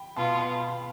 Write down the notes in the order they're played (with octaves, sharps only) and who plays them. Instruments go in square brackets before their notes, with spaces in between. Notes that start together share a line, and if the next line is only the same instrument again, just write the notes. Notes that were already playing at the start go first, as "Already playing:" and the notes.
Already playing: [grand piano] G5 B5
[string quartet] B2 B3 F4 [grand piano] A5 C6
[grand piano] F5 A5
G5 B5